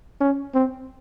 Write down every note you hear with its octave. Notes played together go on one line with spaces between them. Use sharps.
C#4
C4